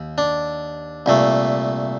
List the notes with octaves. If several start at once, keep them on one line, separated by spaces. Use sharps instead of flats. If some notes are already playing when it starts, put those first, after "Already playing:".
Already playing: D#2
D4
C2 A#2 A3